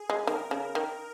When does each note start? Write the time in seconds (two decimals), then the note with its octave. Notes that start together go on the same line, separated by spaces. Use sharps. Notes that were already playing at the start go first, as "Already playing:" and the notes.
Already playing: G#4
0.10 G#3
0.27 D#3 A#4
0.51 C#3
0.75 D#3